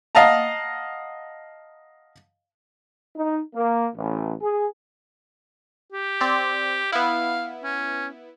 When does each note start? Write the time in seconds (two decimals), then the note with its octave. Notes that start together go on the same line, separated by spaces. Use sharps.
0.15 D#5 F5 F#5 A5 A#5
3.16 D#4
3.54 A#3
3.94 A1
4.42 G#4
5.92 G4
6.21 C4 D5
6.92 B3 E4 F5
7.64 C#4